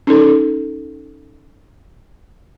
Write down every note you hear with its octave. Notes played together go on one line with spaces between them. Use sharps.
C#4 D#4 A4